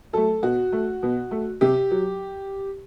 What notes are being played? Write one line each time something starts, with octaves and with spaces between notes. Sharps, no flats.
F#3 A3 A4
B2 F#4
A3
B2
A3
C3 G4
F#3